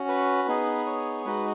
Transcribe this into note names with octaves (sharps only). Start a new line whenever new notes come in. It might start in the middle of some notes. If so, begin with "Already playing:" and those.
Already playing: C#4 F#4
B4
B3 D#4 G#4
C#5
G#3 D#4 F#4 B4